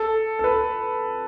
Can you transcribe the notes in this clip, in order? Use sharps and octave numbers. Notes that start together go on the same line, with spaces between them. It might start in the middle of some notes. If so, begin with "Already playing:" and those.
Already playing: A4
A4
B4